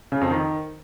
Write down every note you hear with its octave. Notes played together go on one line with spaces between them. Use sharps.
C#3
F2
D#3